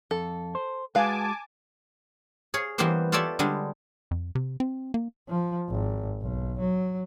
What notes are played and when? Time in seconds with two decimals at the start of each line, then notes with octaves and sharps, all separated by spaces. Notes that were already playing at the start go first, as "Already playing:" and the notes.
0.11 F2 A4
0.55 C5
0.95 G#3 F#4 B4 F5 G#5 A5 D6
2.54 G#4 C#5 F5
2.78 E3 G3 A#3 B3 G4 C5
3.12 F4 G4 A4 C#5 D5 E5
3.39 D3 G3 G#3
4.11 F2
4.35 C3
4.60 C4
4.94 A#3
5.29 F3
5.70 G#1
6.22 B1
6.60 F#3